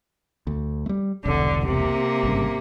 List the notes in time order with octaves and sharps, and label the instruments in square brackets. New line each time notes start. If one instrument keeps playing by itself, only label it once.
[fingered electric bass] D2
G3 A3
[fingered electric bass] E1 C2 [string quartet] D3
[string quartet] C3 A#3
[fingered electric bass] G#1 G2 C#3